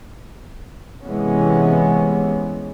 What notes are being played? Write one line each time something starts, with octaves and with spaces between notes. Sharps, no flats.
C3 E3 G#3 B3 C#4